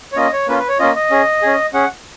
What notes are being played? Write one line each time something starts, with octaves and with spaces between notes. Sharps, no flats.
C#5
A#3 C#4 F4 D#5
C#5
A#3 C#4 F4 B4
B4
C#5
A#3 C#4 F4 D#5
D#5
C#4 G#4
C#4 G#4
C#4 G#4 F#5